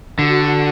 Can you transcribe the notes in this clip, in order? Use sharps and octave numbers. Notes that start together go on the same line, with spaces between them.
D3 F#4